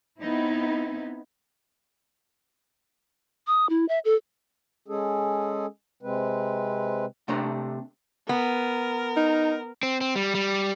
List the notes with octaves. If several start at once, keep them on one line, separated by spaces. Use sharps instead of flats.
B3 C4 D#4 E4
D#6
E4
E5
A4
G#3 C#4 G#4 A4
C3 G#3 C4 B4
C3 A3 D4 C5 A#5
B3 A#4
D#4
C4
C4
G3
G3